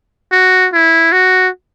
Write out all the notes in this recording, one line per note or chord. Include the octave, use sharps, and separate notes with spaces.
F#4
E4
F#4